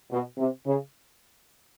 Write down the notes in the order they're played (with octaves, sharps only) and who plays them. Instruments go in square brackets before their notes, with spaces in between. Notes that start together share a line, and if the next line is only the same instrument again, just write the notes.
[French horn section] B2
C3
C#3